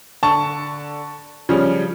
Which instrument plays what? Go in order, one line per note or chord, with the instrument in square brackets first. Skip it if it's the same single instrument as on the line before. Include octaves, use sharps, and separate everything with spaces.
[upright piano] D3 [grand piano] A5 C#6
[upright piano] C#3 G3 C#4 [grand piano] F3